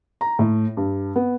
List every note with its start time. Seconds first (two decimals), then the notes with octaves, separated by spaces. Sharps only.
0.21 A#5
0.39 A2
0.77 G2
1.16 B3